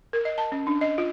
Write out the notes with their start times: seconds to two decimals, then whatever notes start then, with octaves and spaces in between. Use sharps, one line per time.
0.13 A#4
0.25 D#5
0.38 A5
0.52 C#4
0.67 D4
0.81 D#5
0.98 F4